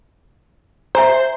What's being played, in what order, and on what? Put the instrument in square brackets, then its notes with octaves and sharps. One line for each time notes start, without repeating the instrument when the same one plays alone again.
[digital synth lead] C5 [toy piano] E5 G#5 A#5